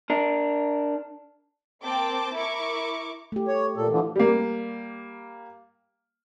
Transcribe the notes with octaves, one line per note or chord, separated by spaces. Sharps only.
D4 A#4
A#3 C4 G5 A5 D6
E4 A#4 C#6 D6
A3 G4
C#5
A#2 A4
D3 E3 F3
G3 A#3